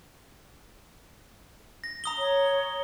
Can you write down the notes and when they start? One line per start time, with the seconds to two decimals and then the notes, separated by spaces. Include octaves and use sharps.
1.84 A#6
2.04 A#5 D#6 G7
2.18 C#5